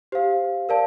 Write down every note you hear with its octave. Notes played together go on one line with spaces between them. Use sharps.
G4 C5 F5
A#4 D5 F5 A5